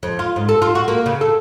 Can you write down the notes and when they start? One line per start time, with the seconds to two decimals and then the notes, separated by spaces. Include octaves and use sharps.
0.03 F2
0.19 F4
0.36 G#2
0.49 A4
0.62 F4
0.75 F#4
0.88 A#3
1.06 C#3
1.21 A4